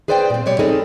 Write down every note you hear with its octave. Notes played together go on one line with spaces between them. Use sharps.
G#4 B4 C5 D5 F#5 G5
A#2 C4
B2 G3 C#5 D5
G3 C4 D#4 G#4 A4